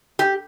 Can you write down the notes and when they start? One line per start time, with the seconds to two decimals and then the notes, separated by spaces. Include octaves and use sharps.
0.19 G4